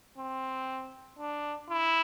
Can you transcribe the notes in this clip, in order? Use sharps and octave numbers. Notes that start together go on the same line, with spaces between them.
C4
D4
E4